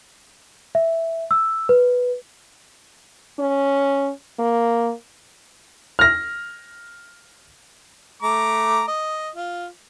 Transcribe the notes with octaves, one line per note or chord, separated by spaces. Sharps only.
E5
E6
B4
C#4
A#3
F6 A#6
A3 A#5 D6
D#5
F4